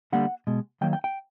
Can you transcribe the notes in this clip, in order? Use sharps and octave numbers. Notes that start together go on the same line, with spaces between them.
D3 G3 A#3 F#5
B2 G#3
D#3 F#3 A#3 G5
G5
G5